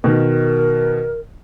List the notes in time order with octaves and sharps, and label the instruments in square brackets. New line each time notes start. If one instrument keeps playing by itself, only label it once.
[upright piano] B2 D#3 [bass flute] A#4